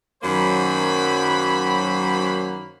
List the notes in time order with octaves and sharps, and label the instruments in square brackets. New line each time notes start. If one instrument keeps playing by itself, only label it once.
[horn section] F#2 D#3 F#3 A#3 C5 B5